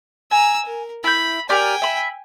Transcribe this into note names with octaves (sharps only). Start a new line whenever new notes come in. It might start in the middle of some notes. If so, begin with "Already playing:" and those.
G#5 A#5 E6
A#4
E4 B5 G6
G4 A#4 D5 G5 G#5
E5 B5